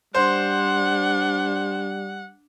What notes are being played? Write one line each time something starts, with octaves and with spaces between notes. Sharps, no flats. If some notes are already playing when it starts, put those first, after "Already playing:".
G3 D4 C5 F#5